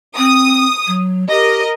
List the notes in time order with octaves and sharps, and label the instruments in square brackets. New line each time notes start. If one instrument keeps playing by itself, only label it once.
[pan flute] C4 [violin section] D#6
[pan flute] F#3
[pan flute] G4 [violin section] A#4 D#5